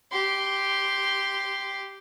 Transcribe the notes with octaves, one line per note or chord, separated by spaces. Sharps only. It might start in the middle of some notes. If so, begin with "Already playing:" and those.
G4 C6